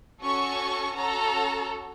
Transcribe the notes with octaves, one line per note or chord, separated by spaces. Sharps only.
C#4 F#4 A4 C#6
C#4 F#4 A4 A#5